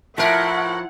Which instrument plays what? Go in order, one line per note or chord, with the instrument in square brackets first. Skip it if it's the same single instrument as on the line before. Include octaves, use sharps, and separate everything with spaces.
[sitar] A2 A#4 [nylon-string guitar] F3 [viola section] E4 F#5 [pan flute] E5